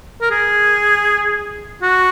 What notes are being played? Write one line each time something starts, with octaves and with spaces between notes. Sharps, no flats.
A#4
G#4
F#4